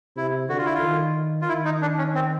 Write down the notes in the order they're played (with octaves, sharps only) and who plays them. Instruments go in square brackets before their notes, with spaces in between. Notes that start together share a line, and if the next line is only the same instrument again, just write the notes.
[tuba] C3 [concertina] E4
[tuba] D3 [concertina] F#4
[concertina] F4
E4
F4
[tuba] D#3
[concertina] F4
[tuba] D#3 [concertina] E4
[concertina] D#4
D4
C#4
C4